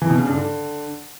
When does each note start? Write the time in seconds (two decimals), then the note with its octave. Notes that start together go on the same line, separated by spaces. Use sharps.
0.02 E3
0.10 B2
0.18 C#3
0.26 G2
0.35 D3